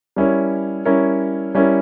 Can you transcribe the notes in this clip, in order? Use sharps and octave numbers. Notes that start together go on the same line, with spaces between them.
G3 C#4 E4 A#4 C#5
G3 C#4 E4 A#4 C#5
G3 C#4 E4 A#4 C#5